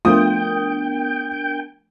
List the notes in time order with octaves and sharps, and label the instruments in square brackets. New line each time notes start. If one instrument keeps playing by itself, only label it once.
[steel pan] F3 A3 F4 [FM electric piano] B3 D4 A#4 [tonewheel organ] G5 [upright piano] D#6